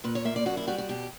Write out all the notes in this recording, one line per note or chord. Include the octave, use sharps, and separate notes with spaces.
A#2 B4
C#5
A#3 E5
D5
F#2 F#4
E4
G3 F#4
F#4
B2 G4